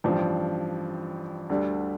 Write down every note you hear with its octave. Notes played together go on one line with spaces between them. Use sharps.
A1 G2 F3
D2 D3 G3